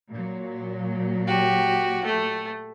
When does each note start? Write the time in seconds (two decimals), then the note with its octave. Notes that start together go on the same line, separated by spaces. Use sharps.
0.10 A#2 F#3
1.27 F#4 G4
2.05 A3